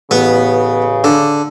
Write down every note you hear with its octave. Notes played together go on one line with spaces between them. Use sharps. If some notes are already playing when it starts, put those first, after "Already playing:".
A1 C#3 B3
D3